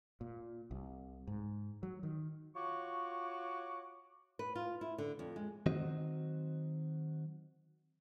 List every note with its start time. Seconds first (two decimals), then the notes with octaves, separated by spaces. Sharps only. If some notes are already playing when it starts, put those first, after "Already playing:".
0.21 A#2
0.71 C2
1.27 G#2
1.83 F#3
2.03 D#3
2.55 F4 F#4 C#5 C#6 D6
4.39 B4
4.55 F4
4.81 E4
4.98 D3
5.19 F2
5.36 G#3
5.66 D#3 F#3 C4 F#4 D#5